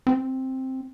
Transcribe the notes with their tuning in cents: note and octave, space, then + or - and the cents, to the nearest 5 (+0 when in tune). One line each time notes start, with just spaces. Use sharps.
C4 +5